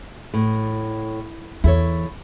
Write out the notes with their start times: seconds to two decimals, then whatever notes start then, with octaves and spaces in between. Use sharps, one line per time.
0.34 A2
1.64 E2 E4 A4 C#5